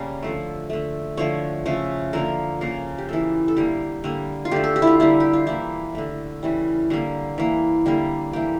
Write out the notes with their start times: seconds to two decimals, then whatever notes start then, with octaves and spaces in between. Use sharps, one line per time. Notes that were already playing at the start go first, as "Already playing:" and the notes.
Already playing: C#3 G3 A#3 C#5
0.22 D3 F3 A3
0.70 D3 A3
1.17 D3 F3 A3 C#5
1.66 C#3 F3 A3
2.13 D3 F3 A#3 A#4
2.61 C#3 F3 A#3
2.98 G4
3.09 E3 A#3 A4
3.48 A4
3.56 D3 G3 A#3 G4
4.04 D3 G3 A#3
4.45 F4
4.51 D3 A3 G4
4.64 A4
4.76 G4
4.82 E4
4.87 F4
5.00 D3 G3 A#3 E4
5.20 G4
5.33 F4
5.47 E3 A#3 E4
5.95 D3 A3
6.43 C#3 E3 G3
6.90 D3 G3 A#3
7.38 E3 A#3
7.86 D3 G3 A#3
8.33 E3 A#3 G4